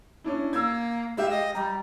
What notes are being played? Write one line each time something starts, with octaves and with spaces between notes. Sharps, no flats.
C#4 D4 E4
A#3 E6 G#6
G#3 G4 E5 F5
D#5
G3 A#5